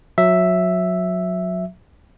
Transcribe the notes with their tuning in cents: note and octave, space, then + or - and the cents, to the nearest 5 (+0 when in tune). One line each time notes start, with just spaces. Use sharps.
F#3 -25 E5 +0